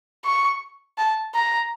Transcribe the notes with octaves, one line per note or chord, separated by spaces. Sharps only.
C#6
A5
A#5